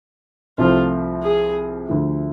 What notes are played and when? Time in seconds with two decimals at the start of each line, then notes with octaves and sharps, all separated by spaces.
0.58 C2 C3 F3 A3 F4
1.23 G#4
1.88 D2 D3 F3 A3